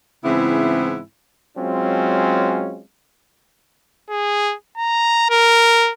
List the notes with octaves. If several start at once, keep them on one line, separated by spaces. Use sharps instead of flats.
G#2 C#3 E3 B3 C4 E4
F#3 G#3 C4 C#4 F4
G#4
A#5
A#4